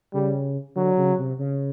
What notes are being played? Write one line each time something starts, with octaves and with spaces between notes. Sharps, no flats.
C#3 G3
D3 F#3
C#3
C3
C#3